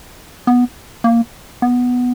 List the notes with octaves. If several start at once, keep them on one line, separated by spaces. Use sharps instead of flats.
B3
A#3
B3